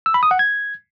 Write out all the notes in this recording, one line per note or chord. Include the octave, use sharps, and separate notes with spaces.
E6
B5
D#6
F#5
G#6